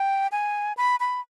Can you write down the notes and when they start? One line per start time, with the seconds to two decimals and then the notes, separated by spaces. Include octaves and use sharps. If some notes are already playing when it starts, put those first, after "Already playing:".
Already playing: G5
0.32 G#5
0.77 B5
1.00 B5